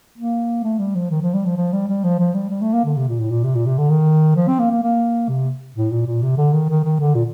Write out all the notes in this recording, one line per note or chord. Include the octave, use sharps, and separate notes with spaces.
A#3
A3
G3
F3
D#3
F3
G3
F3
F3
G3
G3
F3
F3
G3
G3
A3
A#3
D3
C3
A#2
A2
A#2
C3
A#2
C3
D3
D#3
F3
C4
A#3
A#3
A#3
C3
A2
A#2
A#2
C3
D3
D#3
D#3
D#3
D3
A#2